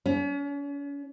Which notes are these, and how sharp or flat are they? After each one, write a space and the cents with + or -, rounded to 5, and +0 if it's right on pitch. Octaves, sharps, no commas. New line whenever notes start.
C#4 +40